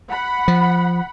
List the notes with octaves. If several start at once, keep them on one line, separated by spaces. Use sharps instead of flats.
F#5 B5
F3